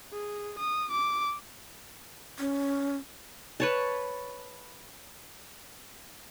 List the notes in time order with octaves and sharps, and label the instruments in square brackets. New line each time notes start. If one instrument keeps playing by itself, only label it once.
[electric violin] G#4
D#6
D6
[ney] C#4
[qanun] B4 C#5 A5